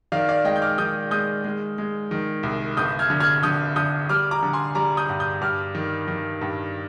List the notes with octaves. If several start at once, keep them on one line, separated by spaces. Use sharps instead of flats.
D#3 D5 F5
D5 F5
G#3 D#5 G5
G6
D6 F6
D#3 D#6 G6
G#3 D#6 G6
G#3
G#3
D#3
C2
G1 D#6 G6
F6 G#6
D3
F6 G#6
D3 D#6 G6
D3 D#6 G6
G3 D6 F6
A#5 D6
D3
G#5 C6
G3 A#5 D6
D#6 G6
G2
D#6 G6
G2 D6 F6
D#3
D#3
G2